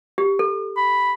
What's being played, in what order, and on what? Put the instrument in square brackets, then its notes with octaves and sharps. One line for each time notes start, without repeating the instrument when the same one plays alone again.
[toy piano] G4
A4
[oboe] B5